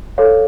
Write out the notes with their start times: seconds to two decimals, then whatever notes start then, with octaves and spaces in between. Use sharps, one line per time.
0.18 A4 C#5 F5